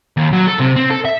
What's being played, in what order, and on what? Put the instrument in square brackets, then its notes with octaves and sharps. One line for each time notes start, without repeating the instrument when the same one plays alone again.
[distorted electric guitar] D#2
F#3
A4
C3
C4
A4
E5